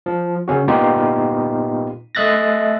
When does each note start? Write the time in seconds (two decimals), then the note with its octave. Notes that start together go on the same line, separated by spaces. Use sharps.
0.06 F3
0.48 C#3 C#4 F#4
0.68 A#2 B3 D#4 F4 G4
2.15 A3 D#5 E5 F#6 A6 A#6